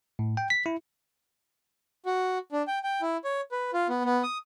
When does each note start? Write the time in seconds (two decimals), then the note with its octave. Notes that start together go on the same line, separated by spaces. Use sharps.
0.19 A2
0.37 G5
0.50 B6
0.66 E4
2.06 F#4
2.52 D4
2.68 G5
2.84 G5
3.02 E4
3.25 C#5
3.52 B4
3.74 F4
3.89 B3
4.05 B3
4.23 D#6